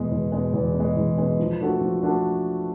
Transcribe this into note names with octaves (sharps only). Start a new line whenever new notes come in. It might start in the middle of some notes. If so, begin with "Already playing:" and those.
Already playing: E2 B2 G#3
E2
B2 G#3
E2
B2
G#3
E2
B2 G#3
F3
A3 D4 F#4 A4
F3
A3 D4 F#4 A4